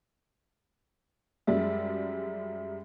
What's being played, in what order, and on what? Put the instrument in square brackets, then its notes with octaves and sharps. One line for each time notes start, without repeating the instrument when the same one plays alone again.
[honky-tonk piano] F#2 G3 G#3 [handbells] E5